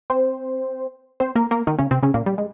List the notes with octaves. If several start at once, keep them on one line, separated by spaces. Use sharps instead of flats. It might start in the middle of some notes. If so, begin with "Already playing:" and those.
C4 C5
C4 C5
A#3 A#4
A#3 A#4
D#3 D#4
C#3 C#4
C3 C4
C#3 C#4
A#2 A#3
G3
G#3